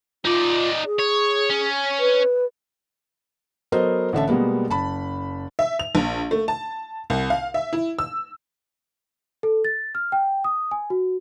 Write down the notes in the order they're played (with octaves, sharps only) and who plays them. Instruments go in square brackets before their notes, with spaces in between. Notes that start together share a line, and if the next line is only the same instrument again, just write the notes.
[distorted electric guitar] D#4 D5 [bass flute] F4
[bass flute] G#4
[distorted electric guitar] C#5
C#4
[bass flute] B4
[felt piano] F#3 B3 A4 A#4 C5 D#5
A1 D3 E5 A5
B2 G3 G#3 A#3 B3
F#1 A5 B5
[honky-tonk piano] E5
F7
A#1
A3
A5
C2
F5
E5
E4
E6
[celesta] A4
A6
F6
G5
D#6
G#5
F#4